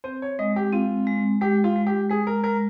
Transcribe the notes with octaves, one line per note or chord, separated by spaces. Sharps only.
C4 C5
C#5
G#3 D#5
G4
C4 F4
G#3
G#3 G4
F4
G#3
G4
G#3 G#4
A#4
G#3 A#4